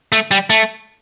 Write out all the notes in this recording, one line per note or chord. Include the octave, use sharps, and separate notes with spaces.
A3
G3
A3